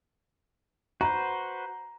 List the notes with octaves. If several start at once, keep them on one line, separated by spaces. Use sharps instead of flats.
F#4 B4 C5 A#5